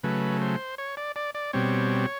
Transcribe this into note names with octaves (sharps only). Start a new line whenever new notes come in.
C#3 F#3 A3 B4
C5
C#5
D5
D5
D5
B2 G3 C4 C#5